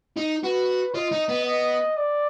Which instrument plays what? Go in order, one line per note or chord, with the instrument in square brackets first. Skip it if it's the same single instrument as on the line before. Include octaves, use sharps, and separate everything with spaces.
[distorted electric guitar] D#4
[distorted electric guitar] F#4 [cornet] B4
[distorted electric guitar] F4 [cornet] D#5
[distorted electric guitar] D#4
B3
[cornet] D#5
D5